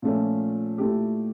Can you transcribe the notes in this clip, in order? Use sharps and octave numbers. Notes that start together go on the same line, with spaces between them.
A#2 F3 A3 C#4
A#2 A3 E4 G4